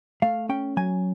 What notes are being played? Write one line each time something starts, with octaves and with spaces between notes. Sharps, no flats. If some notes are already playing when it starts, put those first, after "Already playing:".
A3 F5
C#4 G5
F#3 G#5